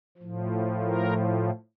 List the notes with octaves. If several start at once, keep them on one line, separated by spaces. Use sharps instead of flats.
A2 F3
A#4